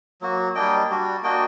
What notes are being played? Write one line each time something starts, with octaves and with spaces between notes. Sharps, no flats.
F#3 A#3 F#4
G3 A#3 D4 D#5 G5
G3 D4 F#4
A#3 D4 F#4 D#5 G5